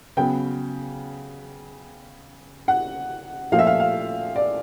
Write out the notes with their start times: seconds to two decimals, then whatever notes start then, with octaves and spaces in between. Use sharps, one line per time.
0.17 C#3 F#3 B3 G5
2.68 F#5
3.52 A#2 F3 A3 F5
3.59 E5
3.67 F5
3.80 F5
4.36 D5